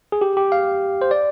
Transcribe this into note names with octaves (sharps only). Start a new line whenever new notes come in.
G#4
G4
G4
F5
C5
D5